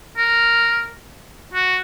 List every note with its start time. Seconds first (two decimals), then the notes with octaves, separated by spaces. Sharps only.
0.17 A#4
1.54 F#4